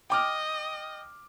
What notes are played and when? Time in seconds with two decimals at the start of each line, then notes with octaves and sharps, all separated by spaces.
0.10 D#5 G5 D6 F6